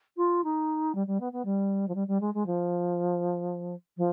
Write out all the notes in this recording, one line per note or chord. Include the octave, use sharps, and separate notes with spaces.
F4
D#4
G3
G3
B3
B3
G3
F3
G3
G3
G#3
G#3
F3
F3